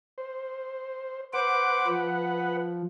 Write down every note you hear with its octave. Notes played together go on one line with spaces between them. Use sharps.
C5
B4 C5 F#5 D6
F3